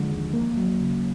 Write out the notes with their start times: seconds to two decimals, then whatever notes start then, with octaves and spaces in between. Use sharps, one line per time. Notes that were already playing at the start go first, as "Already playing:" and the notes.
Already playing: D3 F3 G#3
0.10 D#2
0.33 A#3
0.57 F#3
0.80 C#3